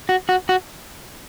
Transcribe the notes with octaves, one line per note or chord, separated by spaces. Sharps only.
F#4
F#4
F#4